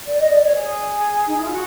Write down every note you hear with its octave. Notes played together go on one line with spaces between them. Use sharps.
D5
D#5
D5
C#5
G#4
D#4
E4
F4
F#4